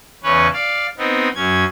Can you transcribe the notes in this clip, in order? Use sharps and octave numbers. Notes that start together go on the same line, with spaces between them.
E2 C#3 C#4 B4 C#5
D5 F5
B3 C4 D#4
F#2 C#4 G#6